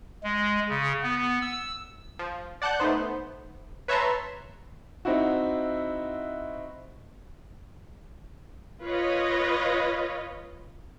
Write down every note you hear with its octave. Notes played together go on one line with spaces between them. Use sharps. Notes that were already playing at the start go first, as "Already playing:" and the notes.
G#3
C#3
B3
E6
F3
D5 F#5 A5 F#6 G6
A3 B3 D#4 C5
B4 C#5 E5 A5 A#5 C6
C4 D#4 E4 F#4
F4 B4 C#5 D#5